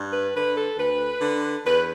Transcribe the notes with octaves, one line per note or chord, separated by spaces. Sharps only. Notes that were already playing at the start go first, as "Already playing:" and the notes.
Already playing: G2
B4
D3 B4
A4
D2 B4
D3
E2 B4